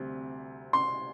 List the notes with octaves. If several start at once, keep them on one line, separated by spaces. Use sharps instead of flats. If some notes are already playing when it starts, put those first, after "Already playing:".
Already playing: D2 C3 G3 C4
C6